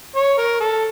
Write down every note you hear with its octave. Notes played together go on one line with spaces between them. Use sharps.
C#5
A#4
A4